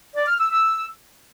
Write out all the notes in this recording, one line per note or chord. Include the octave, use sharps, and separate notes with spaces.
D5
F6
E6
E6